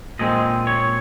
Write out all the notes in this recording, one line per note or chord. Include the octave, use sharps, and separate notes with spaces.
A#2 G#3 C4 D#5
C#5